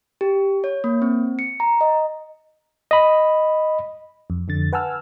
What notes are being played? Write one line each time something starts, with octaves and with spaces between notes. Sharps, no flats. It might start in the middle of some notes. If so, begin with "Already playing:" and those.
G4
C#5
A#3
C4
C#7
A#5
D#5
D#5 B5
F2
F2 D3 A6
B4 F#5 G#5 A5 E6 F6